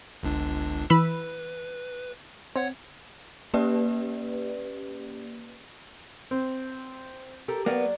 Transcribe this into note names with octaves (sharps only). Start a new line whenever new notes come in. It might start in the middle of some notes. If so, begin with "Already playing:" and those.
G1 C#2 D4
E3 B4 B5 E6
C4 C#5 F#5 G#6
A#3 C#4 G4 B4 D5
C4
G4 A4 A#4
F#3 A#3 B3 D5 G5